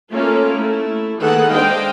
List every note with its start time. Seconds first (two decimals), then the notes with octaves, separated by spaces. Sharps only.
0.12 A3 A#3 C#4 F4 A4 A#4
0.59 A3 E4
1.22 D#3 A#3 G#4 A4 B4 F#5
1.52 G#3 D4 C5 D#5 F5 G5